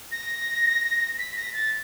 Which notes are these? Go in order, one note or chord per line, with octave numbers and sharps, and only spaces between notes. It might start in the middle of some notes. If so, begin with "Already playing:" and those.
A#6
B6
A#6
A6